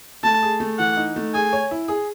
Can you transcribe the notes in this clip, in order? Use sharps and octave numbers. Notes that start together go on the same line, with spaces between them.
A3 A5
G#4
A3
E3 F#5
D#4
A3
G#4 G#5
C#5
E4
G#4